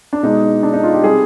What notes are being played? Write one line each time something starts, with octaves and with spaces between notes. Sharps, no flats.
D4
B2 G#3 D#4
D4
D#4
F4
G4
C3 G3 G#4